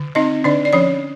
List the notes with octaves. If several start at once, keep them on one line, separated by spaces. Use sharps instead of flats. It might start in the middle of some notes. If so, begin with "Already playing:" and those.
Already playing: D3
C4 D#4 D#5
D3 D4 D5
D5
F3 C#4 C#5